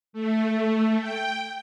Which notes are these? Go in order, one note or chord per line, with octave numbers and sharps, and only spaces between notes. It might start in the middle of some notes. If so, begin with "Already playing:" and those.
A3
G5